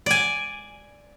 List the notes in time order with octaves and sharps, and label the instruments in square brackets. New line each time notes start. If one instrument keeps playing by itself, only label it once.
[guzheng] D5 G#5